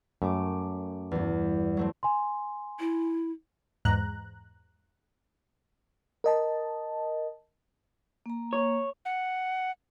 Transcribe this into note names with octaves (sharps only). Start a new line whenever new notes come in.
F#2 A3 D6
E2 G2
F#3 A3 C4
G#5 C6
E4
E2 G#2 A#5 F#6
A#4 D#5 A5
A#3 A#5
C#5
F#5